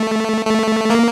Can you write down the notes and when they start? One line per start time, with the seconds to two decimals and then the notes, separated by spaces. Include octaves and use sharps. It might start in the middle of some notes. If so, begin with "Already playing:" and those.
Already playing: A3
0.46 A3
0.90 A#3